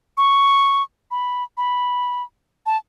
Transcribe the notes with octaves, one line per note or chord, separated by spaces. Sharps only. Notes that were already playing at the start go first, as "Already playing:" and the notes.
C#6
B5
B5
A5